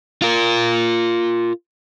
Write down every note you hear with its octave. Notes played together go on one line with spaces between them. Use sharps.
F4 A#4